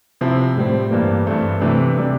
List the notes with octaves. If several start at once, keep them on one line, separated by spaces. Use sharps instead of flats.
C3 F3 C4 E4
A2 G3 C4
G2 E3 G3 A#3
G2 E3 A3 C4
C3 E3 A3 D4
C3 G3 D4